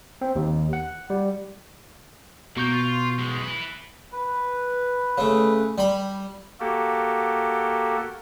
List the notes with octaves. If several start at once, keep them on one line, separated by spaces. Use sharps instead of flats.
C4
D#2
F#5
G3
B2 A#3 C#6 G6
F4
B1 G#3
E4 B4
B4
C#3 A3
G3 B5
A#3 F#4 G4 A4